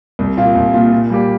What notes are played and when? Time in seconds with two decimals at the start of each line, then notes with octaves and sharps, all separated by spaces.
0.19 C2
0.37 A#2 A#3 F4
0.55 C2
0.73 A#2 A#3 F4
0.92 A#2
1.10 G3 A#3 G4